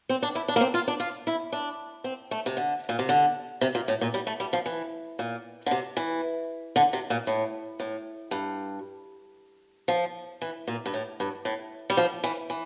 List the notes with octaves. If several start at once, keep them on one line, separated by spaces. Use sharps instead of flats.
C4
D4
E4
D4
A#3
C4
F4
D4
F4
E4
D4
C4
A3
C3
D3
A#2
C3
D3
C3
A#2
A2
A#2
G3
A3
G3
F3
E3
A#2
D3
C3
E3
D3
C3
A#2
A2
A2
G2
F3
E3
A#2
G2
A2
G2
A2
G3
F3
E3
E3